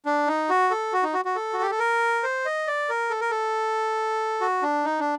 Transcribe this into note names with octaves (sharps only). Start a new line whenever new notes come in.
D4
D#4
F#4
A4
F#4
D#4
F#4
F#4
A4
F#4
G4
A4
A#4
C5
D#5
D5
A#4
A4
A#4
A4
F#4
D4
D#4
D4